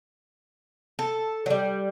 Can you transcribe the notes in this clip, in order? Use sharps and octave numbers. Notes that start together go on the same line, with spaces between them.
A4
F#3 G3